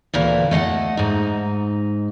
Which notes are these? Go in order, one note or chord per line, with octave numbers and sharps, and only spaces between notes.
D2 A#2 E3
A3 D#5 F5 F#5
G#2 D#4